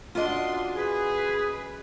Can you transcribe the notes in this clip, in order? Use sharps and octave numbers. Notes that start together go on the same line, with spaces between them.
F#2 D4 F4 D#5 F#5 C6
G#4 B4